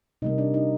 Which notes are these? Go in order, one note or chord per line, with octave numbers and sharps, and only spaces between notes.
C3 G3 A#3 D#4 D#5
D4 D5
D#4 D#5